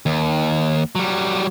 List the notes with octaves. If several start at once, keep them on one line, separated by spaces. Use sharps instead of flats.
D#2
F#3 G3